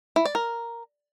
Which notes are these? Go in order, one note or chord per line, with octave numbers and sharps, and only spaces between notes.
E4
D5
A#4